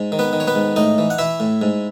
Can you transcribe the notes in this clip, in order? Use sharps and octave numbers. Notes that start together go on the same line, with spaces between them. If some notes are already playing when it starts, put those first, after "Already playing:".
Already playing: G#2
D#3
B3 B4
D#3
C#5
B3 B4
G#2
A2 D#4 D#5
E3
F#5
E3 E4 E5
A2
G#2